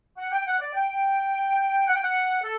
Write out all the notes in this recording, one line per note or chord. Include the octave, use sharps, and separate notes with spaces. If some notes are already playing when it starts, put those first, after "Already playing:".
F#5
G5
F#5
D5
G5
F#5
G5
F#5
A4